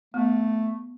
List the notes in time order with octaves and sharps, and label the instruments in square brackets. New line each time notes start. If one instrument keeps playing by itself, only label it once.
[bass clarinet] A3 [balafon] B3